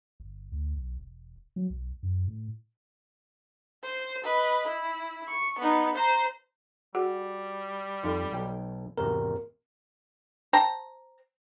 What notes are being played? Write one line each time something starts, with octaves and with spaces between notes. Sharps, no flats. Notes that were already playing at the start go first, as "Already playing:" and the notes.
G1
D2
B1
E1
F#3
B1
F#2
A2
C5
B4 D#5
E4
C#6
B3 D#4
C5 A#5
G3 F#4 G#4 F#5
F2 D#4 A4
B1 G5
G#1 E2 C3 A#4
C5 G5 A5 A#5